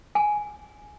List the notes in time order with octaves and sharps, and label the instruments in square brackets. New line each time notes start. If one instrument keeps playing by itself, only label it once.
[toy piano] G#5